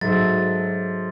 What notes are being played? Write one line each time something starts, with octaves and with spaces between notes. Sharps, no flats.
G#2 F#3 A4 E5 A6